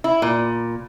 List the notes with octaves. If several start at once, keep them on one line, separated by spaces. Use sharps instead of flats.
E4
A#2